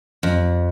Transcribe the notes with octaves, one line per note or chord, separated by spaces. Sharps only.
F2